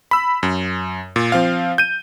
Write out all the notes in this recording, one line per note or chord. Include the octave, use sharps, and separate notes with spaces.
B5 E6
F#2
A#2
F3 C4 F5
G6 D#7